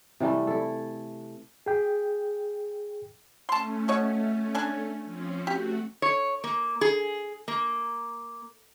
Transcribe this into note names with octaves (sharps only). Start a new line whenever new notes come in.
C3 E3 G3 A3
E4 A4
G#4 G5
A3 C#4 A5 C6
B2 C#5 D#5
D4 G#5
F3 C4 C#4
A3 F#4 G4
C#5
A#3
G#4
A#3